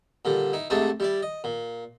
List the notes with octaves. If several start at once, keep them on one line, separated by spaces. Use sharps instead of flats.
A#2 D3 G3
D#4 E4
G#2 C3 A3 D4 D#4 A5
G3 E4 D5
D#5
A#2